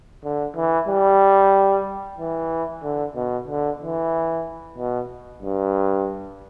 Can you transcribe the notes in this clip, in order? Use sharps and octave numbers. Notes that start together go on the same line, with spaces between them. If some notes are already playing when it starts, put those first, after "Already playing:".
D3
E3
G3
E3
D3
B2
D3
E3
B2
G2